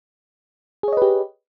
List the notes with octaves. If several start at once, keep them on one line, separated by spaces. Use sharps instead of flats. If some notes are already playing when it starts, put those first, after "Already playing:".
G4 G#4 B4 C#5 D#5